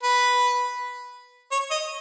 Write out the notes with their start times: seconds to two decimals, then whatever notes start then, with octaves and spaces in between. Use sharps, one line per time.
0.03 B4
1.52 C#5
1.71 D#5